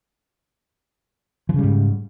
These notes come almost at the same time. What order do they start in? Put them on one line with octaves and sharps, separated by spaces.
E3 C#3 G3 G#2